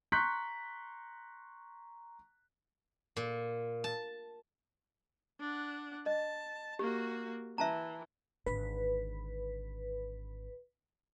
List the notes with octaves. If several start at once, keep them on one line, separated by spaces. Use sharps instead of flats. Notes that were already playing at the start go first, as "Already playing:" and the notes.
A#5 C6 C#6 F#6 G6 B6
A#2
A5
D4 F#5
D#5 A5
A#3 F#4 G4
E3 E5 A5 A#5
G#1 D3 B4